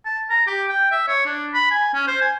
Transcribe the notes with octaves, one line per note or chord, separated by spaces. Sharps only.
A5
A#5
G4
G5
E5
C#5
D4
B5
G#5
C#4
C5
G#5